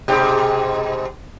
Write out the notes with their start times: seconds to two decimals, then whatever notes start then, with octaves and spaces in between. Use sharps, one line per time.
0.08 G#2 B2 G4